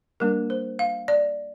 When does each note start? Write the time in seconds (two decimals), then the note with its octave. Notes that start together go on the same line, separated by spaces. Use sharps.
0.20 G3 A#3 D4 A#4
0.50 C5
0.79 F5
1.08 D5